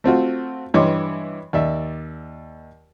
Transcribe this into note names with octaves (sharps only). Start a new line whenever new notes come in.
A3 C4 F4 F#4
G2 E3 C#5 D#5 C6 D6
D#2 D5 E5